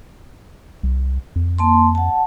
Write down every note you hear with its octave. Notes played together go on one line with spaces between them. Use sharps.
C2
F2
A#3 A5 C6
F#5 A5